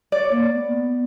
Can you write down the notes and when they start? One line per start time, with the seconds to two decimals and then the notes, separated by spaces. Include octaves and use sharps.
0.12 C#5 D5
0.31 A#3
0.54 B3